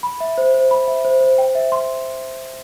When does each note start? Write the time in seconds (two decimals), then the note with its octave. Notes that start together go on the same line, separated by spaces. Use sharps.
0.03 B5
0.20 E5
0.38 C5
0.54 C5
0.71 B5
0.88 E5
1.05 C5
1.21 C5
1.38 G5
1.55 E5
1.72 C6